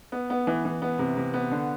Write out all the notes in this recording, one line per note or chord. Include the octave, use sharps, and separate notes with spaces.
B3
B3
E3
E3
B3
C3
C3
B3
D3